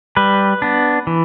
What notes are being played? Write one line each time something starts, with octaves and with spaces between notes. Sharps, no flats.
G3 B4
B3 D4
E3